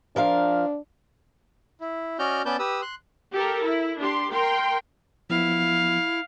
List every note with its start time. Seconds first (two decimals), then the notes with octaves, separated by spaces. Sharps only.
0.16 F3 D4 A#4 F5
1.81 E4
2.19 C#4 F#4 D5 D#5 F6 G6
2.45 B3 C#4 B4 D5 A5 G6
2.59 G4 B4 D#6 E6
2.82 C6 F#6
3.32 G4 A4 A#4
3.63 E4
3.99 D4 G4 C6
4.31 A#4 G5 C6
5.30 F3 B3 E4 F5